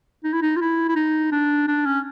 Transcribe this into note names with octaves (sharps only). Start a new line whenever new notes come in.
D#4
E4
D#4
F4
E4
E4
D#4
D4
D4
C#4